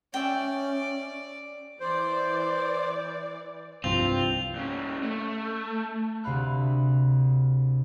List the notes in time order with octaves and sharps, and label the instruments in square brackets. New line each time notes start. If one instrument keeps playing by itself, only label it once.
[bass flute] C#4 [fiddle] D5 [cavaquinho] E5 G5
[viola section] E3 D5 [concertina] C5
[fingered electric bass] C2 G2 F3 [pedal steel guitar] C4 [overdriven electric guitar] F4 [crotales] F7
[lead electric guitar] A#2 C#4
A3
[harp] D2 C3 F5 B5 F#6